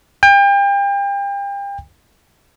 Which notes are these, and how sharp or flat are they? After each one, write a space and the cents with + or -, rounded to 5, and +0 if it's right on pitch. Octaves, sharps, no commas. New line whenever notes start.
G5 +35